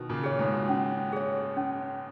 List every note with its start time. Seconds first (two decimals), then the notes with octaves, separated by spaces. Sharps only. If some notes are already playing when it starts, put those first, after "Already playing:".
Already playing: B2 D#3
0.09 A#2 C#3
0.24 G#4 C#5
0.39 G#2 B2
0.69 C#4
1.13 G#4 C#5
1.57 C#4